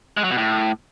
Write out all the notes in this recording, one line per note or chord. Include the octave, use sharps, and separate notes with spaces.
G#3
F#3
B2
A2